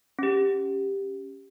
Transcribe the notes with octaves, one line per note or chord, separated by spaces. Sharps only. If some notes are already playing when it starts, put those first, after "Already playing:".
C#4 G4